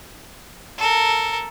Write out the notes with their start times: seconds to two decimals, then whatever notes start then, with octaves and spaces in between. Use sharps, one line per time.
0.78 A4 A#4